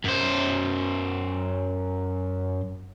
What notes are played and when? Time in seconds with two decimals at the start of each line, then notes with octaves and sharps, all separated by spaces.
0.05 F#2 C5